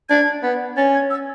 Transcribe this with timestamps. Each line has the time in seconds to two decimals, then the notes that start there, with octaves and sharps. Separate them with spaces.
0.09 D4 G#6
0.43 B3
0.77 C#4 A6
0.94 G#6
1.10 E6